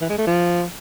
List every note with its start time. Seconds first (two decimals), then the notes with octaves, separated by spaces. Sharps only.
0.01 E3
0.10 G#3
0.18 A3
0.27 F3